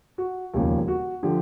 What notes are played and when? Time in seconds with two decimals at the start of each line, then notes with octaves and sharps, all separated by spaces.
0.18 F#4
0.54 E1 D#2 C#3 F3 G4
0.88 F#4
1.23 D3 F3 G4